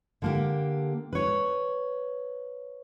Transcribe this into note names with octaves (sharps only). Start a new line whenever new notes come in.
D3 A#3 G4
B4 C#5